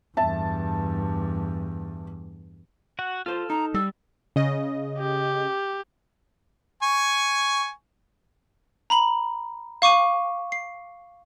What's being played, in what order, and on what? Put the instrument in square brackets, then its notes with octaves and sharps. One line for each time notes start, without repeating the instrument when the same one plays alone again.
[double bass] E2 G2 [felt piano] E5 A5
[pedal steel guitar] F#4 F#5
[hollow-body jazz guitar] F4 C5 [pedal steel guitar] A4 F6
[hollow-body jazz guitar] D#4 [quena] A#5
[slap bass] G3 [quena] E6
[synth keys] C#3 D#5
[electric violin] G4
[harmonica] G#5 C#6
[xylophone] A#5 B5 F#7
F5 C#6 D6 D#7
C7